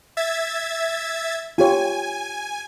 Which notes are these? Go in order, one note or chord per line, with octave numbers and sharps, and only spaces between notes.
E5 G#6 A6
F4 G4 C#5 G#5